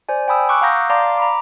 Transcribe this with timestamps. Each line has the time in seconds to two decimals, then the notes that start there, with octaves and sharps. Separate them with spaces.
0.09 C5 D5 G#5
0.28 G5 G#5 B5 D#6 E6
0.49 C#6 D6 E6 F#6
0.61 F5 F#5 A#5 D#6 G6 A#6
0.90 D5 F5 A5 A#5 C6 D6
1.17 A#5 B5 D6